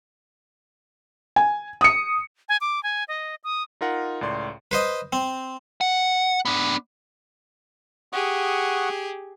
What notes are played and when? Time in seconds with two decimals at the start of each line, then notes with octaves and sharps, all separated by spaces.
1.36 G#5
1.81 D#6 C#7
2.49 G#5
2.61 D6
2.83 G#5
3.08 D#5
3.44 D#6
3.81 D#4 F4 A#4 F#5
4.21 C#2 A2 D5 C6
4.71 B4 C5 D#5
5.13 C4
5.81 F#5
6.45 B3 D4
8.13 G4 G#4 F#5 C#6 D#6